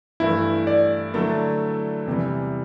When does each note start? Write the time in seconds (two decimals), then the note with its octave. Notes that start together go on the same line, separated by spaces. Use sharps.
0.20 G2 E3 A3 E4
0.67 D5
1.14 D3 F#3 A3 E4 A4
2.06 E2 C3 E3 G3